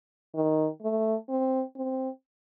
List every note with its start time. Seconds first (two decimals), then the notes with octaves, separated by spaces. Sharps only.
0.35 D#3
0.82 A3
1.29 C4
1.76 C4